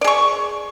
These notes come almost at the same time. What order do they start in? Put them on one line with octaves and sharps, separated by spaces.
D5 G#4 C#6